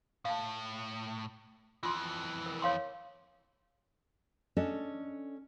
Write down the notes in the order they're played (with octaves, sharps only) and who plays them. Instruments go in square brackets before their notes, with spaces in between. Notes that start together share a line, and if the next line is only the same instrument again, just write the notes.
[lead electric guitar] A2 [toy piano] F5 A5
[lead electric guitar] F2 E3 [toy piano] F4 C6
[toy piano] A#4
C#5 F5 C6
[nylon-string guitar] C#4 D4 A4 D#5